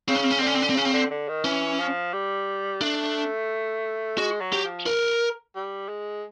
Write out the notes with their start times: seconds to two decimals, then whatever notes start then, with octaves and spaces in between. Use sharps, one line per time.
0.08 C#3 C4
0.15 C#4
0.24 C4
0.31 C#4
0.39 D3 C4
0.47 C#4
0.54 C4
0.62 C#4
0.70 C4
0.76 C#3 C#4
0.85 C4
0.93 D3
1.10 D3
1.28 D#3
1.44 E3 C#4
1.79 F3
2.13 G3
2.81 A3 D4
4.18 G#3 F#4
4.40 F#3
4.53 G4
4.64 F3
4.86 A#4
5.55 G3
5.88 G#3